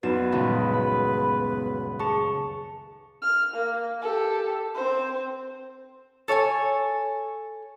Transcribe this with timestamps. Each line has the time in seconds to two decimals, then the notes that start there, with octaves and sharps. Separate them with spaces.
0.03 F#2 B3 D#4 F#4 B4 D5 E7
0.32 D#1 C#2 G#4
0.74 B5
2.00 G#4 A5 C#6
3.22 F6
3.54 A#3
4.02 G4 A4
4.75 C4 C5
6.28 A4 C#5 F5 G#5